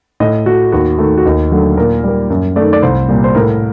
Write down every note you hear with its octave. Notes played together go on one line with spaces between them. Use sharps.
A2 D#5
A3 F#4
D#2 F#4
D#3 A3
F#4
D#2 D#4
D3 F#3 A3
A#2 A#4
G3 A#3
F#2
D#3 A3 D5
D5
C2 C5
A#2 G3 A#3
C5
A2 A#4